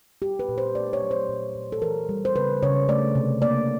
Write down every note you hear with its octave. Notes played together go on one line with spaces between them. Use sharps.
G3 G4
B4
A#2
C5
A3 D5
C#5
F#3
C5
A#2
A#2
A4
E3 A#4
G3
C5
C#3 B4
C#3 C#5
A3 D5
C3
A#3 D5